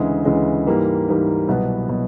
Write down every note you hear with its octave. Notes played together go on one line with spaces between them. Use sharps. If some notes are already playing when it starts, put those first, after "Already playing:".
Already playing: D2 C#3 E3 G#3
D2 C#3 E3 G#3
G#2 E3 G3 A#3
G#2 E3 G3 A#3
C2 B2 F#3 B3
B2 F#3 B3